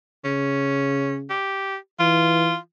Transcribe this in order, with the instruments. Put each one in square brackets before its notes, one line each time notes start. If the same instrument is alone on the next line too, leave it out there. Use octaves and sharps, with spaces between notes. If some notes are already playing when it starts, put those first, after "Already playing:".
[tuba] C#3 [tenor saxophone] C#4
[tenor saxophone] G4
[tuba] E3 [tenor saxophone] F4